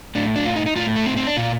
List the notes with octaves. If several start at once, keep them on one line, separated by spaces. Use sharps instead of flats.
A2 D4
D4
F4
D#4
D#4
A2 F4
A3
C4
C4
D4
A#2 F4